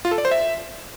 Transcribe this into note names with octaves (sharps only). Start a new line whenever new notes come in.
F4
A4
D5
C5
E5